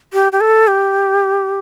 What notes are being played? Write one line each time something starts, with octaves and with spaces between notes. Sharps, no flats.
G4
G4
A4
G4